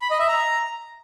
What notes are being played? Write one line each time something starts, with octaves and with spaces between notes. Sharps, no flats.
B5
D#5
E5
A#5